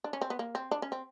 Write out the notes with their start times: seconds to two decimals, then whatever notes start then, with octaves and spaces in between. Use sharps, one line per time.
0.04 D4
0.13 C#4
0.21 C4
0.30 B3
0.39 A#3
0.55 C4
0.71 D4
0.82 C#4
0.92 C4